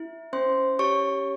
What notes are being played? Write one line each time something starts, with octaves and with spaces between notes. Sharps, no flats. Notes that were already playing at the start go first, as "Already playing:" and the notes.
Already playing: E4
C#4 C5 C6
G4 C#5 C#6